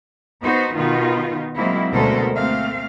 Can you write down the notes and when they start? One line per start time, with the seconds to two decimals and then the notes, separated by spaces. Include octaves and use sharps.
0.42 B3 D#4 F#4 C5
0.75 B2 D#3 B3 D#4 F4
1.54 F#3 G#3 A#3 C4 E4
1.92 D2 B2 G#3 A4 A#4 C5
2.35 A3 A#3 C4 F5